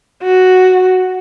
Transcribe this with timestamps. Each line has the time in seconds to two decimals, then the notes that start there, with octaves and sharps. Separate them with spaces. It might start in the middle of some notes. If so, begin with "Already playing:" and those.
0.23 F#4